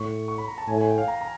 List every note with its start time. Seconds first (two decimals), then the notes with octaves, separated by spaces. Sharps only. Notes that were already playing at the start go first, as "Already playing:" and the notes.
Already playing: A2 C#6
0.28 C#6
0.38 B5
0.48 A#5
0.58 A5
0.68 A2 G#5
0.78 G#5
0.88 G5
0.98 F5
1.08 A#5
1.21 A#5